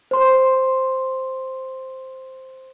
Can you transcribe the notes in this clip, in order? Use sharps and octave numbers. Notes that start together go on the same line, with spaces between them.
C5 C6